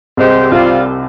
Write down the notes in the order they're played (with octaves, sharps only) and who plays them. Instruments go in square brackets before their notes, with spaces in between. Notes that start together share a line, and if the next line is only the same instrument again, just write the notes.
[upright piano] C2 C3 [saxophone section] G#3 C4 G4 C5 D#5
[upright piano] C2 C3 [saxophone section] G3 C4 F4